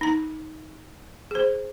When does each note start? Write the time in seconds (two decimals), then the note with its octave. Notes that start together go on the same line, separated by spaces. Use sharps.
0.01 D#4 A#5
1.31 G#4 C5